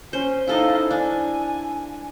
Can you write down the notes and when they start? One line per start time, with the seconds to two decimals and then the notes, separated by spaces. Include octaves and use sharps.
0.13 C#4 C5
0.47 D#4 E4 A4 D#5 F5
0.91 D4 G#5